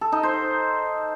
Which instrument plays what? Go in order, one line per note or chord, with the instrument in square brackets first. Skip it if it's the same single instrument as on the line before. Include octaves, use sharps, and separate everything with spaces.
[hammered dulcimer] A4
D#4
C5